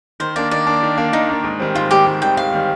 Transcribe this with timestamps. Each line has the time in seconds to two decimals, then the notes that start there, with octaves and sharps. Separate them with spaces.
0.20 D#3 C5
0.36 A#3 D4 D5
0.51 D#3 D5
0.67 A#3 D4
0.83 D#3
0.97 A#3 D4
1.13 D#3 D#4
1.29 A#3 D4
1.44 G#2
1.60 D#3 G3 C4
1.75 G#2 F4
1.91 D#3 G3 C4 G4
2.06 G#2
2.22 D#3 G3 C4 G5
2.37 G#2 F5
2.53 D#3 G3 C4